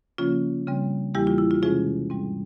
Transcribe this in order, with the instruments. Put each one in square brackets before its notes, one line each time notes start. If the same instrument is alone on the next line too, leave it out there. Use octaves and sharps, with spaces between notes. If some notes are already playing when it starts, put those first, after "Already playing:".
[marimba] C#3 F3 A#3 C#4 F4
C#3 G3 C4
E2 E3 G3 A#3 E4 G4
F4
E4
F4
C3 E3 G#3 C#4 F4 G#4
G#2 G3 C4